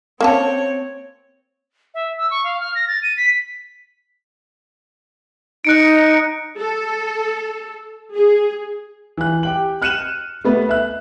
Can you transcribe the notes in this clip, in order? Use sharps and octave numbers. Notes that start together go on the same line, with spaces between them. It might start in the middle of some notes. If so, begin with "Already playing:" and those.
A#3 C4 C#4 C#5 A5
E5
E6
C#6
F5
F6
A#6
A6
D#7
B6
D#4 F#6 C#7 D7
A4
G#4
E3 F#6
G4 G5 F#7
F6 F#6 C#7 D#7 E7 F#7
A3 B3 B4
E5 F#6